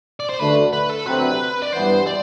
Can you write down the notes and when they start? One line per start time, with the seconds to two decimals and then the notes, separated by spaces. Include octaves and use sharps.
0.20 D5
0.29 C5
0.39 D2 D3 A3 D4 B4
0.73 B4
0.89 A4
1.06 D2 C3 F#3 C4 B4
1.62 D5
1.73 G2 E3 B3 C5
2.07 D5